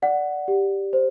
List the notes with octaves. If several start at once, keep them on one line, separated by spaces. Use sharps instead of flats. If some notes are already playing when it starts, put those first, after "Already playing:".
D5 F#5
G4
C5